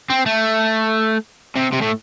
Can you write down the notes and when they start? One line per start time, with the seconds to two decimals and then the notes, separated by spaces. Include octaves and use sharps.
0.10 C4
0.26 A3
1.56 C3
1.72 C3
1.82 A2